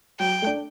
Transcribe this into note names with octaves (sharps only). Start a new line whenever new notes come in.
F#3 G5
A3 D4